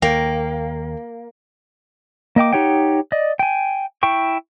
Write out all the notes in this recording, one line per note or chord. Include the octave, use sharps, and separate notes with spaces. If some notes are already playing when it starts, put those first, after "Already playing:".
D#2 A#3 G5
A#3 D#5 G5 D6
D#4 G4 C#5 F#5 G5
D5 D#5
G5 G#5
E4 G5 C#6